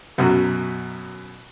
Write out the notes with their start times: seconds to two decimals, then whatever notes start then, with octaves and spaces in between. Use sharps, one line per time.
0.18 F#2 B2 F#3 F#4